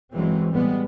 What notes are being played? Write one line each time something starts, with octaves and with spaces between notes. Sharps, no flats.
G1 G2 E3 F#3 G#3 C4
A2 G3 G#3 B3